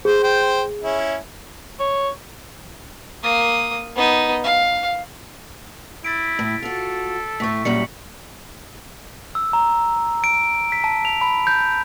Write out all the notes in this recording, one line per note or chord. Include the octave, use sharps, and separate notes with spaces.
G#4 C5
C5 G5
C#4 E4
C#5
A#3 D#6
B3 D#4
F5
E4 A6 B6 D7
A2
F4 F#4 A4
A2 A3 C#6 B6
F#2 A#2 G3 C#7 F#7
E6
A#5
D7
B6
A5
F7
B5
G6